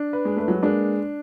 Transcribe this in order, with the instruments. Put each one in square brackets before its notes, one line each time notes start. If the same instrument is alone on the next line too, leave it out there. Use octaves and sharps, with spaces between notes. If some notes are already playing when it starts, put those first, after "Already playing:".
Already playing: [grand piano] D4
B4
[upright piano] G#3
[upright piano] A3 [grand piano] B4
[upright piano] F#3 G#3
[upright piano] G#3 A#3 [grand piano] D4